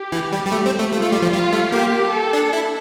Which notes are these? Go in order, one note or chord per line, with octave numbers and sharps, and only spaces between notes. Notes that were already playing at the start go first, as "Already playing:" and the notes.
Already playing: G4
E3
G3
G3
A3 G4
C4
A3
A3 F4
A3
G3
F3
G3 F4
A3
A#3 G4
A4
D4
E4